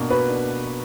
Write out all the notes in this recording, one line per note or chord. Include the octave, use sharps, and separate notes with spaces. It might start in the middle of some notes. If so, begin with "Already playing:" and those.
Already playing: B2 A#3 D4
F#4 B4
D4